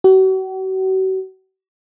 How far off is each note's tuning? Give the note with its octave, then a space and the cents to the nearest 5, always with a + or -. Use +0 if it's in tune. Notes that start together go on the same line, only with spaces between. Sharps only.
F#4 +40